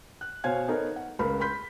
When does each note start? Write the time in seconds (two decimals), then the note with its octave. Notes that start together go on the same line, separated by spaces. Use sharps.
0.21 F#6
0.44 B2 C5 C#5 F5 G#5 G#6
0.68 B3 D#4 A4 A#4 C#5
0.96 F#5
1.19 C#2 A#4 B5
1.40 B5 C6 G6 B6